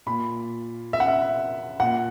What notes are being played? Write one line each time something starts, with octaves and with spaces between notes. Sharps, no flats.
A#2 B5
E5
F#5
E5
A#2 F#5